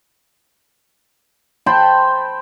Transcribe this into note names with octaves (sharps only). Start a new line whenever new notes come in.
C5 G5 A5 B5